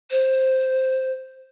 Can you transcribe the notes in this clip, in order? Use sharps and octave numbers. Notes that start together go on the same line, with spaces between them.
C5